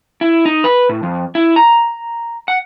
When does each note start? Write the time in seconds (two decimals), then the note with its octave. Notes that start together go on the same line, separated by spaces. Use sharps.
0.21 E4
0.46 D#4
0.64 B4
0.89 A2
1.03 F2
1.35 E4
1.56 A#5
2.48 F#5